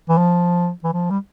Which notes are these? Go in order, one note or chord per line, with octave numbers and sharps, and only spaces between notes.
E3
F3
E3
F3
G3